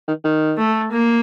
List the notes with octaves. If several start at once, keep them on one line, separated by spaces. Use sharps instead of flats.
D#3
D#3
A3
A#3